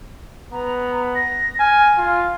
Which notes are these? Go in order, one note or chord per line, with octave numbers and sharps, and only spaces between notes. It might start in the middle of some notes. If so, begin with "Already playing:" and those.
B3 A#5
A#6
G#5 F6
F4